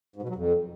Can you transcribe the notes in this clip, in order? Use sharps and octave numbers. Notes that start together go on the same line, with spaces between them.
G#2
B2
F#3
F2